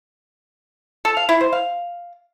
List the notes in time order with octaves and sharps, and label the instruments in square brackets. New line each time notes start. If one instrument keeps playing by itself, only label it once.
[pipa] A4
F5
E4
C5
F5